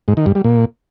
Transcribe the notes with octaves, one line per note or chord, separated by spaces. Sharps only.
G#2
D#3
G2
G3
A#2